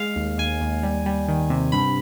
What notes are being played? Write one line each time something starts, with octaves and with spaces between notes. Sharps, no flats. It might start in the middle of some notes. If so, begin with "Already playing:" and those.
Already playing: G#3 F5
D#2
D#2 G#5
D#2
G3
G3
D#3
C3
G2 B5